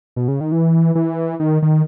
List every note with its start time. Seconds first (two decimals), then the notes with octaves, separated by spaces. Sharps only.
0.16 B2
0.28 C#3
0.41 D#3
0.52 E3
0.95 E3
1.40 D#3
1.62 D#3